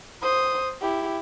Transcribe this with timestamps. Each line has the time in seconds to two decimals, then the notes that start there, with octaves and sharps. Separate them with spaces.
0.22 C5 D#6
0.81 E4 G4